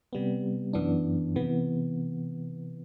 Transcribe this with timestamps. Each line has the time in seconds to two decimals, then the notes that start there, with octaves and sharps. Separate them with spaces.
0.13 C3 G3 B3
0.73 F#2 E3 B3 D4
1.36 C3 E3 B3